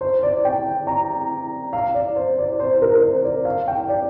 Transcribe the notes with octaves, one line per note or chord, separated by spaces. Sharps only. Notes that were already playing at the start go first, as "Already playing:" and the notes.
C5
D5
G5
A#5
F5
D5
C5
D5
C5
A#4
C5
D5
F5
G5
D5